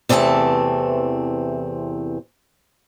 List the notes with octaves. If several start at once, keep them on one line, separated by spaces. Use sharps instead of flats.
E2 C3 E3 A3 C4 A5